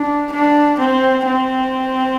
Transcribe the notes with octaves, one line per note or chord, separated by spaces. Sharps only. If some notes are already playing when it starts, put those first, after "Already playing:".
Already playing: D4
D4
C4
C4